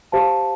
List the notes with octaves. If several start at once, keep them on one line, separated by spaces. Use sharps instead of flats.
G4 C5 F5 A5